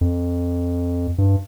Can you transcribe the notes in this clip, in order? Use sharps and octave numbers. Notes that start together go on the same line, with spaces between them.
F2
G2